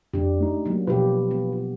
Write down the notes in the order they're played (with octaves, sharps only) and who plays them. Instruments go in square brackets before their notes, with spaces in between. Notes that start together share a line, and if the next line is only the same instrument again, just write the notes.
[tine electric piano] F2 [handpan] D4 G4
[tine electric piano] A3 D#4
[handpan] F#3 A#3
[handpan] B2 F3 G4 [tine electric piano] F4 B4
[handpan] B3